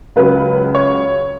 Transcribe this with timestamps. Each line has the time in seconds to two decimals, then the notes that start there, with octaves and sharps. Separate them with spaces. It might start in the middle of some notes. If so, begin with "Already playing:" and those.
0.16 C#2 C#3 F#3 B4
0.75 C#5